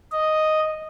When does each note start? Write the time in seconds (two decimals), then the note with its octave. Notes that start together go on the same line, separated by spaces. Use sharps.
0.12 D#5